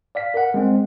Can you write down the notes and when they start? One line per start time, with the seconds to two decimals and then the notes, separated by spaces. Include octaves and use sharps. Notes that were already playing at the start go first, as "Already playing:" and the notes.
0.15 D5 F5 B6
0.34 A#4 F#5
0.54 G#3 C4